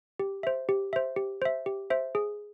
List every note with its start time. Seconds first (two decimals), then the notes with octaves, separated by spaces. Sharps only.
0.19 G4
0.43 C5 E5
0.69 G4
0.93 C5 E5
1.16 G4
1.42 C5 E5
1.66 G4
1.90 C5 E5
2.15 G#4